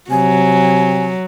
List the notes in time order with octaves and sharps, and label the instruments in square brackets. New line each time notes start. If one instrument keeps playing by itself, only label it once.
[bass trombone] C3 [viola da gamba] F#3 [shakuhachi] G#5